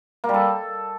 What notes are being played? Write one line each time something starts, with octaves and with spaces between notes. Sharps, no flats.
A#3
G3
A4